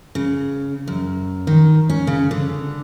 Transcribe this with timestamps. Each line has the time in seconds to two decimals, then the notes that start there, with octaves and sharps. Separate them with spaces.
0.15 C#3
0.88 F#2
1.47 D#3
1.90 C#4
2.07 C#3
2.31 D3